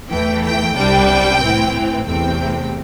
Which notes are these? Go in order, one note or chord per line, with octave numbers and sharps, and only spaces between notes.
E2 E3 A3 G5
G5
C2 C3 G3 D4 G5
A2 E3 C4
E2 C3 A3 C4 G5